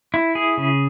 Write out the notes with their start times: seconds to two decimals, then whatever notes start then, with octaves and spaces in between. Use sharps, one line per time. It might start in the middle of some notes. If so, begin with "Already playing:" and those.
0.14 E4
0.35 G#4
0.58 C#3